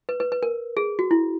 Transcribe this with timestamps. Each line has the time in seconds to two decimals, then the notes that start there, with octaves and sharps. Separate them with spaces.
0.09 B4
0.20 B4
0.32 B4
0.43 A#4
0.77 G#4
0.99 F#4
1.11 E4